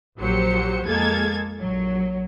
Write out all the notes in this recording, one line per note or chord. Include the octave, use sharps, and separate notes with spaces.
A#1 F#3 G4 C5 C#7
F2 G#3 A#3 A4 G#6 A6
A#1 F#3